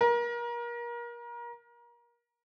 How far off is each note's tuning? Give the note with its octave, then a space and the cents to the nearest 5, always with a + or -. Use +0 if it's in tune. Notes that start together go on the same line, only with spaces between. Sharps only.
A#4 +30